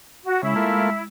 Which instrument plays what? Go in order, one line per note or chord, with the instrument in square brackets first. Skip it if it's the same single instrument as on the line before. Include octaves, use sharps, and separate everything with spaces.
[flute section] F#4
[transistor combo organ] C#3 [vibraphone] G#3 [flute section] E4
[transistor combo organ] A3 A#3 F4